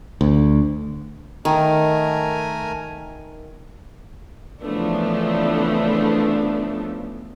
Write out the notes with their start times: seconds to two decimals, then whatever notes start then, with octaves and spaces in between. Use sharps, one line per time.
0.21 D2
1.45 D#3 A3 A#4 G#5
4.62 C#3 E3 F3 A3 B3 D4